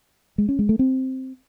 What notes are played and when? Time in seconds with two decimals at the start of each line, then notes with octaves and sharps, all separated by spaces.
0.38 G#3
0.49 C#4
0.59 G#3
0.69 A3
0.79 C4